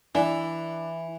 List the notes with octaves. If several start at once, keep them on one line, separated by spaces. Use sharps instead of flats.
E3 D4 E4 G#5